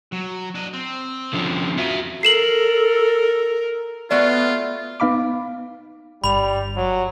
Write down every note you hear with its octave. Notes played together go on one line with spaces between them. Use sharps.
F#3
D4 D#5
C4
D3 F3 C#4
F4 F#4 E5
A4 A#4 C7 E7 F#7
A3 B3 F4 F#4 A4 D5
B3 D#4 F5 B5 D6
G1 G3 B5 F7
F#3